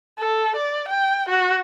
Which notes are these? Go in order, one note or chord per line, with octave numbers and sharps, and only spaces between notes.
A4
D5
G5
F#4